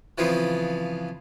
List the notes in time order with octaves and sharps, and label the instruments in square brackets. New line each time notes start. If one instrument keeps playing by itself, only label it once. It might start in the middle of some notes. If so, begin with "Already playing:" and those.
[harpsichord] C#3 E3 F3 B3 C4 F4